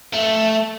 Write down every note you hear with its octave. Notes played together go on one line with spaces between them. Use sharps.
A3